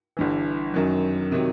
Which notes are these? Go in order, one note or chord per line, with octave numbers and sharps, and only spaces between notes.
G1 G2 E3
F#2 D#3 F#3
C3 D#3 F#3